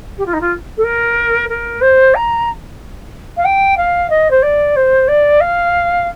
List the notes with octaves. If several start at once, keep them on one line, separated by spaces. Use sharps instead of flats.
G4
F4
D#4
F4
A4
A#4
A#4
C5
A#5
F5
G5
F5
D#5
C5
D5
C5
D5
F5